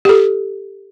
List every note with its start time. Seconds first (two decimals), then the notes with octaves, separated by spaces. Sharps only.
0.05 G4 A4